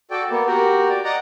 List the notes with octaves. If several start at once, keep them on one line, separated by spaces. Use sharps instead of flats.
F#4 A4 D5 G5
A#3 B3
F#4 G4 A#4
D5
D5 D#5 F#5 A#5